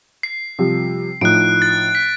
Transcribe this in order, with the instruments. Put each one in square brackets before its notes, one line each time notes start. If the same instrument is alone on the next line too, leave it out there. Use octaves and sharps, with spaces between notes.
[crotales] C7
[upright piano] C3 F3 G3
[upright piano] A2 F3 D#4 [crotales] F#6 D7
[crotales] A6
B6